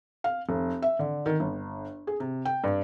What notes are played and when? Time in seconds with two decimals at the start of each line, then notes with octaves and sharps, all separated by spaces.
0.24 F5
0.49 F1
0.82 E5
0.99 D3
1.26 D#3
1.40 G1
2.07 G#4
2.20 C3
2.45 G5
2.64 G2